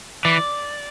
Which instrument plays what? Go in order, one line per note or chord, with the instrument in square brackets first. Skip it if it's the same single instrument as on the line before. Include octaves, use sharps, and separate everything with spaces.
[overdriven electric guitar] E3 [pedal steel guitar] D5